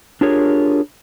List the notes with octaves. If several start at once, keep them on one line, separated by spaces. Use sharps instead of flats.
D4 F4 G4 G#4 A#4 C#5